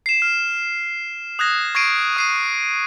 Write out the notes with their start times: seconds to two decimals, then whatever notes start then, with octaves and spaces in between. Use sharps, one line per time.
0.06 C7 E7
0.22 F6
1.39 D#6 F#6 G#6 A#6
1.75 C#6 G#6 A#6 C7 D7 D#7
2.17 D#6 C7 D#7